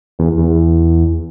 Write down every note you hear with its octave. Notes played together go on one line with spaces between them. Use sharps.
E2
E2